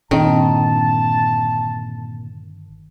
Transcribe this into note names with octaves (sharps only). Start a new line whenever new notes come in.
G1 A#2 D#3 C4 D4 A5